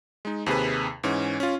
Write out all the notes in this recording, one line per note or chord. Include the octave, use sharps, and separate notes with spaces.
G#3 D#4
D#2 C3 G#4 B4
G#2 E3 C#4
C#4 F4